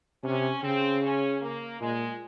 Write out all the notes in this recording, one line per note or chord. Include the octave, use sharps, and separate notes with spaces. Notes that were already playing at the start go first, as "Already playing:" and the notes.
C3 C#4
C#3 C4
C#4
A#3
A#2 G#3